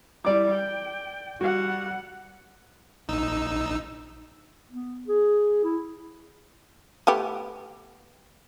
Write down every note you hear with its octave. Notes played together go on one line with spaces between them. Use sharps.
G3 E4 D5 D6
G5
G3 F#4 F#5
A#1 D#4 E6
B3
G#4
E4
A3 B3 G4